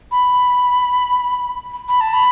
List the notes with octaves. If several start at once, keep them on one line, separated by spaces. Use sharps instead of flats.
B5
B5
A5
B5